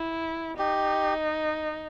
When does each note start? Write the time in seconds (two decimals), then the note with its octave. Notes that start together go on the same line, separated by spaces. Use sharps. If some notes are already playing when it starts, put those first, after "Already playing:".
Already playing: E4
0.58 D#4 G4